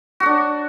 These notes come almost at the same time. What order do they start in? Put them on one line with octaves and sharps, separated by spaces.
F#4 F#5 D4